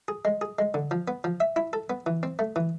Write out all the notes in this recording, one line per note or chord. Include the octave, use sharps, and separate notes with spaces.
G#4
G#3
G#4
G#3
D3
F3
B3
F3
E5
E4
A4
B3
E3
C4
A3
E3